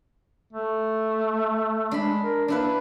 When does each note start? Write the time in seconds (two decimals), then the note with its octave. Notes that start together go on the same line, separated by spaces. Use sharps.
0.53 A3
1.91 G#3 D4 B5
2.23 A#4
2.48 A#3 D4 E4 B4